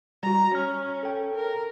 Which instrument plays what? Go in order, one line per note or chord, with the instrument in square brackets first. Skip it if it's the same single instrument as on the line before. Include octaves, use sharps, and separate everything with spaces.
[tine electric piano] G3 F#4 [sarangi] A#5
[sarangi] C#4 [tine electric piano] F6
[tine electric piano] A4 G5
[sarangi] A#4